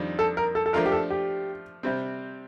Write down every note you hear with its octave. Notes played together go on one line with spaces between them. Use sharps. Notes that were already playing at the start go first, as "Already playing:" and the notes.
Already playing: F2 D#3 G3 D4
A4
A#4
A4
A4
F3 A3 D4 F4 A#4
G4
A4
G4
C3 G3 C4